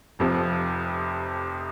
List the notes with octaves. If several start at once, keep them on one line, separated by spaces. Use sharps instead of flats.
F1 F2 C3 F3